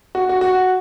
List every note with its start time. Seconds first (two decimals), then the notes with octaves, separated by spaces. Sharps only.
0.15 F#4
0.29 F#4
0.41 F#4